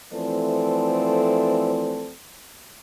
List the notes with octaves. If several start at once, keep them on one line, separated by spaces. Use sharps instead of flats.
E3 F3 A3 C4 A4 D5